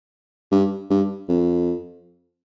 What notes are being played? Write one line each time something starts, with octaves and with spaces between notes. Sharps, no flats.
G2
G2
F2